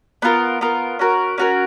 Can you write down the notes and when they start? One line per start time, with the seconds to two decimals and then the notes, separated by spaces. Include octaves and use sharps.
0.22 B3 F4 A#4
0.61 B3 F4 A#4
0.99 C#4 F#4 A#4
1.38 C#4 F#4 A#4